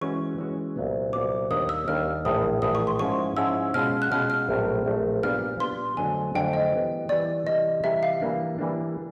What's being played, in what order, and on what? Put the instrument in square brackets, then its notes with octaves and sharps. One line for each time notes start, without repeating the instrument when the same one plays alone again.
[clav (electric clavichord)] E3 G#3 C#4 F#4 [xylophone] C#6
[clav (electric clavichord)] E3 G#3 C#4 F#4
C2 A#2 F#3 B3
[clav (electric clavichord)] C2 A#2 F#3 B3 [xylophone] D6
[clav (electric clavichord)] D#2 D#3 G3 A#3 D4 [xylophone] D#6
[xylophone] E6
[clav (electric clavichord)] D#2 D#3 G3 A#3 D4 [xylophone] F6
[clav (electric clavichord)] A#1 A2 E3 [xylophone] D#6
[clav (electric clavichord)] A#1 A2 E3 [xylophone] D#6
[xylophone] C#6
C6
[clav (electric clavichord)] G#2 F3 G#3 C#4 E4 [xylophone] C#6
[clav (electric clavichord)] G#2 F3 G#3 C#4 E4 [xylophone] E6
[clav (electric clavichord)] B2 G#3 C#4 F4 G#4 [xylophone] F6
[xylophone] F#6
[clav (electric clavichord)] B2 G#3 C#4 F4 G#4 [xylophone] F6
[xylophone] F6
[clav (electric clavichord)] A#1 A2 F#3 A3 C4
A#1 A2 F#3 A3 C4
[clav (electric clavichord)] A#2 G3 B3 D4 F4 [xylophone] F6
[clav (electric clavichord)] A#2 G3 B3 D4 F4 [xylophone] C6
[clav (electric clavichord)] F2 D3 F#3 A3 D4 [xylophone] G#5
[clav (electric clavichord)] F2 D3 F#3 A3 D4 [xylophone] G5
[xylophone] D#5
[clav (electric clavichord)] E3 G3 B3
[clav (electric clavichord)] E3 G3 B3 [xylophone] D5
[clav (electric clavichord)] C3 E3 G3 [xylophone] D#5
[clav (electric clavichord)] C3 E3 G3 [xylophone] E5
[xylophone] F5
[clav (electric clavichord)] E3 G3 A#3 D4
E3 G3 A#3 D4